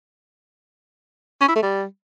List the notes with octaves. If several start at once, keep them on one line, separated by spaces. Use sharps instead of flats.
C#4
E4
A3
G3